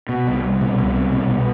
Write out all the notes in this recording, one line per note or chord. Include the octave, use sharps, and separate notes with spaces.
B2
C2
G3
B2
C2
G3
B2
B2